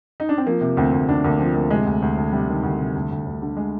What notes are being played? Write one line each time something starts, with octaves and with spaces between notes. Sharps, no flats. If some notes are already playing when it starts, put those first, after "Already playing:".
D#4
D4
C4
F3 A#3
C3
D2 C4
D2
D2 D4
D2 A#3
F3 C4
D2 A#3
C3 G#3
D2
D2
D2
C3 G3
D#3
D2
C3
D2
D2
D2
D3
G#3